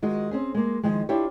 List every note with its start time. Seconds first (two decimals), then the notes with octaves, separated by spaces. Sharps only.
0.02 D#3 G#3 F4 F#4
0.31 C4 C#4 G#4
0.54 G#3 A#3
0.83 D#3 F3 G#3
1.09 D4 E4 F4 G4 C#5